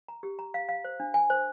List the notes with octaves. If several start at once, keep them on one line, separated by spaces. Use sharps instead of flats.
A#5
G4
A#5
F5
F5
C5
D4
G#5
C5